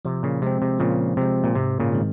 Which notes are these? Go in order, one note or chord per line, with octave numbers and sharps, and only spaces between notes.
C3 F3
A#2 C#3
C3 G#3 C4
C3
A#2 C#3 F3
C3 G#3 C4
A#2
G#2 C3
A#2 C#3
D#3 G#3 C4